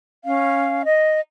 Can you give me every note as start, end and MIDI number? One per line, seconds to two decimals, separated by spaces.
0.23 0.82 61
0.23 0.82 77
0.85 1.20 75